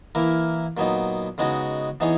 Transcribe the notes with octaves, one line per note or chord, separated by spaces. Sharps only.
E3 A#3 E4 A#4
A#2 F#3 B3 D#4
C#3 G#3 B3 D#4 F#4
E3 B3 D#4 G#4 C#5